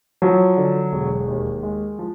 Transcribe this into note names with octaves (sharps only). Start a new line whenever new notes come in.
F3 F#3
D3
E1
D#2
G#3
F3